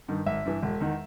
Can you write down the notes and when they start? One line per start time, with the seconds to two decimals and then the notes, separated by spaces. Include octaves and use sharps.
0.08 G2 D#3
0.26 G#1 E5
0.45 G2 E3
0.62 E1
0.80 E2 D#3